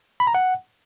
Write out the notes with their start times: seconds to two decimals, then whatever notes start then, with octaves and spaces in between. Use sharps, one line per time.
0.20 B5
0.27 A#5
0.35 F#5